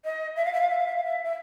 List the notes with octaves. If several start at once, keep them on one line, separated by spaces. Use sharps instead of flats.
D#5
E5
F5
E5
F5
E5
F5
E5
F5
E5
E5